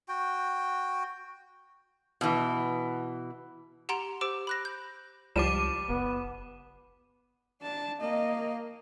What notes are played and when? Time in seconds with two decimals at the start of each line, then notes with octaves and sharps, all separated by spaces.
0.09 F#4 G5
2.21 B2 E3
3.89 G4 F#5 A#5 C6 D7 F7
4.21 G4 C5 D6 E6 D7
4.47 B5 F#6 A#6
4.65 G6
5.36 C#2 F3 G3 D6 D#7 E7
5.89 F#1 B3
7.62 D4 A5
8.01 A#3 D#5